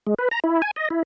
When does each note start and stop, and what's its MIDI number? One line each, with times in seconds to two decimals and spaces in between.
0.07 0.14 56
0.19 0.29 71
0.31 0.40 82
0.44 0.62 64
0.62 0.71 80
0.76 0.89 75
0.90 1.03 64